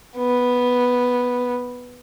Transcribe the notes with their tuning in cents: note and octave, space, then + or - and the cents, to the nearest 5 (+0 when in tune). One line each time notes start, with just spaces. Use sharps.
B3 -5